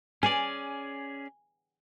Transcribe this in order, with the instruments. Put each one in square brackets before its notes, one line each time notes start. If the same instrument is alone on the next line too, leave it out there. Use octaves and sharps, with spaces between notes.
[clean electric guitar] C#4 G#4 D5 [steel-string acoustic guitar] G#5